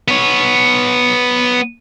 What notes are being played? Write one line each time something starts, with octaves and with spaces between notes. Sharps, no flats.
B3 C#5